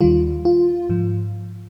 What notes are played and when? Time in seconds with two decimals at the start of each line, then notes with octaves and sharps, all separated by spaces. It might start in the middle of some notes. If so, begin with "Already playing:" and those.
0.01 D#2 D#3 G3 F4
0.45 F4
0.89 G#2 F3